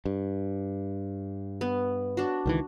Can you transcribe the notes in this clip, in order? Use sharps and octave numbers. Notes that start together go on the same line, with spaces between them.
G2
B3
D4 F#4
C#2 D#3 E3